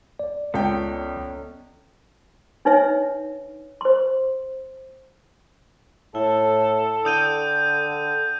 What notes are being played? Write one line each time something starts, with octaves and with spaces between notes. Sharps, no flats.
D5
C#2 B3 C#4 A4 G5
D4 D#4 B4 C#5 E5
C5 C6
A2 E4 A4
D3 D5 G5 D#6 G6 D#7